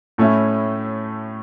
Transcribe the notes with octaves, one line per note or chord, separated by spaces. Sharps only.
A2 A3 C#4 E4